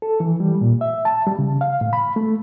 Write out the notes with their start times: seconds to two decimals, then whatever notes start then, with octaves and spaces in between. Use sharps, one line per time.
0.02 A4
0.20 E3
0.40 G3
0.61 A#2
0.81 E5
1.05 A5
1.27 G3
1.39 C#3
1.61 F5
1.81 A2
1.93 B5
2.16 A3